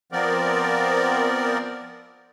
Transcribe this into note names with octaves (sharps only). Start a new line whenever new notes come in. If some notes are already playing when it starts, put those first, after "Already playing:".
F3 B3 C4 A#4 D5